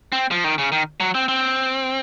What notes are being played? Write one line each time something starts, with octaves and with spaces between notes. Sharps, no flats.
C4
F3
D#3
C#3
D#3
F#3
C4
C4